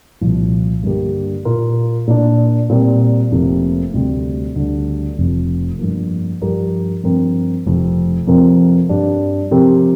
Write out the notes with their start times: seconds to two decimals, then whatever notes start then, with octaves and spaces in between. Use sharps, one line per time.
0.21 C2 A#2 F3
0.83 G2 D3 A#3 G4
1.45 A#2 A#3 F4 A#4
2.07 A#2 A#3 D4
2.70 A#2 G3 C4 A#4
3.31 F1 F2 C3 A#3
3.94 D2 C3 G3 C4
4.55 D2 D3 G3
5.18 F1 F2 C3 F3
5.79 G2 F3 A#3
6.41 G2 F3 D4 G4 A#4
7.03 G2 F3 C4 A#4
7.65 F1 F2 C3
8.27 F2 C3 F3 C4 A#4
8.89 G2 G3 D4
9.51 C3 F3 C4 G4 A#4